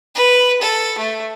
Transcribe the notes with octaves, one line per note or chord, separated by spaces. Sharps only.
B4
A4
A3